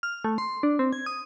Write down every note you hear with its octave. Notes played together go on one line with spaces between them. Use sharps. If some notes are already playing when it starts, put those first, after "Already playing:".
F6
A3
C6
D4
C4
G#6
D#6